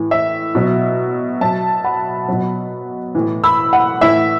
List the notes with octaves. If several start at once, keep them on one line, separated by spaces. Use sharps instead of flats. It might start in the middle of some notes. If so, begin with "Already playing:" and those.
Already playing: A2 E3
E5
B2 F#3
B2 F#3 E5 A5
F#5 B5
B2 F#3
A2 E3
B5 E6
F#5
A2 E3 E5